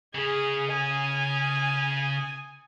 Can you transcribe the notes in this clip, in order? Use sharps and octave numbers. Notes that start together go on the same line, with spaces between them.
C#3 G#4
G#5 D#6
D#6